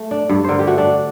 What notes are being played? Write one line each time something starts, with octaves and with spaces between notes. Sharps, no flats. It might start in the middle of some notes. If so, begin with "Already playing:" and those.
Already playing: A3
D4
G2
D3 A#4 C5
G4
A3 F#4
D4